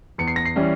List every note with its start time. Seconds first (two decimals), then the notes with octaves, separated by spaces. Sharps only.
0.18 E2 C#7
0.27 C7
0.36 A#6
0.45 C7
0.56 E3 G3 C#4